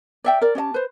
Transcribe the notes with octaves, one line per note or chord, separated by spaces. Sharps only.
D5 E5 G5
A#4 D5
C#4 G4 D#5 A5
B4 C5